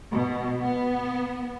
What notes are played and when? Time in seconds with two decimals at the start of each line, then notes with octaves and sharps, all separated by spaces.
0.11 B2
0.58 B3